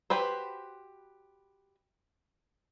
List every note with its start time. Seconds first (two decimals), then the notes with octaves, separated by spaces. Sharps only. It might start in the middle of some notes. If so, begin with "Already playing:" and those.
0.10 F#4 G4 B4 C5